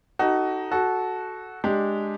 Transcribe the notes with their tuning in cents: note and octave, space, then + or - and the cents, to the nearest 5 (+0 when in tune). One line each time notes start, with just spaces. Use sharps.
D#4 +0 F#4 +25 A4 +5
F#4 +0 A4 -15
G#3 +0 D4 +0 G4 +0